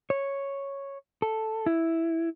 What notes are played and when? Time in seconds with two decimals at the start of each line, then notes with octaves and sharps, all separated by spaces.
0.10 C#5
1.22 A4
1.66 E4